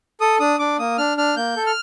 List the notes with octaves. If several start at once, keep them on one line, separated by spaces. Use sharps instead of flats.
A4 D#6
D4 D#6
D4 D6
A#3 D#6
D4 F6
D4 F6
A#3 G6
A4
F6